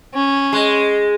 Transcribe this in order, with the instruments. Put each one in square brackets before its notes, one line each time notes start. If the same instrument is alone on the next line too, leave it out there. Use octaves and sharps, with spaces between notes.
[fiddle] C#4
[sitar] G#3